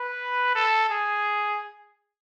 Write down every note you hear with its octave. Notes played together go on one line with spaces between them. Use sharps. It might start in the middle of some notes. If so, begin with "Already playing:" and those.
Already playing: B4
A4
G#4